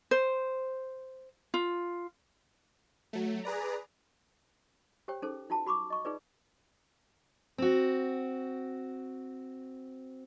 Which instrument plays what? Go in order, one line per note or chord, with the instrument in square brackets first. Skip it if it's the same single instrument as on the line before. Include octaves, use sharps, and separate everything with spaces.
[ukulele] C5
F4
[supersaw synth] F#3 A3
G#4 B4 D5 A#5
[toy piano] G4 C5 C#5 G5
C#4 D#4 G#4 A4 C5
D#4 F4 F#4 A5
F#4 B5 C#6 D6
D#5 C#6
D#4 F4 G#4 B4 C#5 D5
[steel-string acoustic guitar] C4 F#4